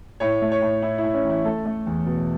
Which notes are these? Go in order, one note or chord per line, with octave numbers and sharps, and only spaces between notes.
A2 C#5
A3
C#5
A2
A2 E4
E4
A2
C#4
A1
E4
A3 A4
A3
E2
B2